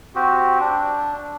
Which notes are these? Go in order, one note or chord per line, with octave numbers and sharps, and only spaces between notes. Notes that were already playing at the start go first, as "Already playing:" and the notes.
C4 F#4 G4
D4